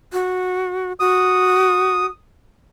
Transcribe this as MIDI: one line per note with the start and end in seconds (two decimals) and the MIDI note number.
0.13 0.93 66
1.00 2.05 66
1.00 2.06 87